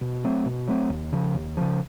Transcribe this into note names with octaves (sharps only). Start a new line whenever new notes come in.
B2
F#3 A3 C4
B2
F#3 A3 C4
D#2
C#3 F3
D#2
C#3 F3